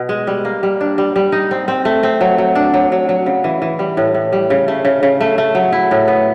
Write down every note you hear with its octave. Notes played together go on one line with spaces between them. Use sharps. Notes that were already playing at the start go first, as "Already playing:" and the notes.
Already playing: B2
G#3
G3
A#3
G3
D4
G3
G3
D#4
C4
C4
A3
C4
F#3
F#3
D4
F#3
F#3
F#3
C#3
E3
E3
G3
A2
A2
G3
C#3
A3
C#3
C#3
A3
A3
F#3
E4
A2
B3